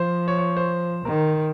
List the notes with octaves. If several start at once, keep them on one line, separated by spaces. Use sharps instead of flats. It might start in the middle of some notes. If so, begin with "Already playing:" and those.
Already playing: F3 C5
C#5
C#5
C5
D#3 A#4